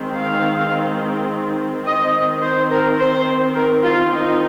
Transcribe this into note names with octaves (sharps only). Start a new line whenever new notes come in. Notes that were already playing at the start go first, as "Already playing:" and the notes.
Already playing: D#3 G#3 C4
F5
D#3 C4 D#5
C5
A#4
C5
A#4
F4
D#3 C4 D#4